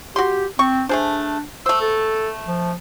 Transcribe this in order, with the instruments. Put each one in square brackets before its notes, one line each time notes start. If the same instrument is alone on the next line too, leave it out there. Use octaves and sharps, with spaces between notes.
[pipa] F#4 C6 [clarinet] G4
[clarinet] C4 [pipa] C#6
[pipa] A3 G#4 C5 [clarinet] D4
[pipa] A3 C5 [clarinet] E6
[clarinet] A4
F3